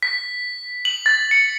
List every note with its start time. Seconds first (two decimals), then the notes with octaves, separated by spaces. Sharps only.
0.03 B6
0.85 F#7
1.06 A6
1.31 C#7